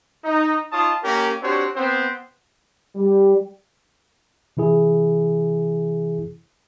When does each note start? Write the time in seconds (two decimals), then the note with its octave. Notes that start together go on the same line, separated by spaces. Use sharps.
0.24 D#4
0.72 D#4 F4 C#5 A5 D#6
1.03 A#3 C#4 G4 A#4
1.42 C4 D4 F#4 G4 C5 C#5
1.76 B3 C4 C5
2.95 G3
4.57 C3 E3 E4 G#4